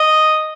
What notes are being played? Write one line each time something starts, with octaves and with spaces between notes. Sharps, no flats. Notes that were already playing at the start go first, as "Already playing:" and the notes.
Already playing: D#5